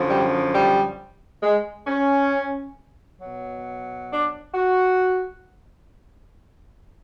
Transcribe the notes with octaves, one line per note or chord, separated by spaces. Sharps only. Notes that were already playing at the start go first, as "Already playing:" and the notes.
Already playing: F#2 D3 F3
G3
G3
G#3
C#4
B2 F#3
D4
F#4